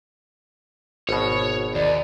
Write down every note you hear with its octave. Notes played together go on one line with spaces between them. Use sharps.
G#1 B2 C#5
D#2 D5